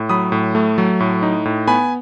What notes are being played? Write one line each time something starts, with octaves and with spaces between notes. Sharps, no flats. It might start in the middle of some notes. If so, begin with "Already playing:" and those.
Already playing: A2
F#3 B5 D#6
A2
A3
F#3
A2
D#4
A2
B3 G#5 B5